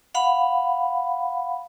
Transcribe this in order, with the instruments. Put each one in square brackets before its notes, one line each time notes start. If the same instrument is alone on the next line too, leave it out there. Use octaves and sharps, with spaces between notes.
[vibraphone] F5 F#5 B5